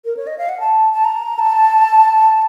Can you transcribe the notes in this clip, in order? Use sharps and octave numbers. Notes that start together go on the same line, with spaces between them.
A#4
C#5
D#5
F5
F#5
A5
A5
A#5
A5